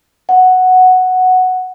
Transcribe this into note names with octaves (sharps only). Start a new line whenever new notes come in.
F#5